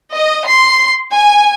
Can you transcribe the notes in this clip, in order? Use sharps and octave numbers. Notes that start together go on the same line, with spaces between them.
D#5
C6
G#5